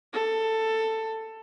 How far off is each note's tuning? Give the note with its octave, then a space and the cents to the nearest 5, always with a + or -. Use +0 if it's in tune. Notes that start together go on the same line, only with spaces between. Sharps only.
A4 +15